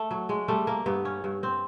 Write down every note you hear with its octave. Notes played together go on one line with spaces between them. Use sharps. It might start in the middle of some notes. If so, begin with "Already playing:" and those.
Already playing: A3
F#3
G#3
G3 A3
A#3
G2 B3
C#4
G2
C4